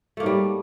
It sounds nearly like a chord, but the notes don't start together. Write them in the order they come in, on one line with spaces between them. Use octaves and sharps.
A3 A#3 G#2 G3